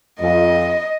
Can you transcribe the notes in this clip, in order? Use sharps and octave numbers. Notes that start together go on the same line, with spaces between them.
F2 D#5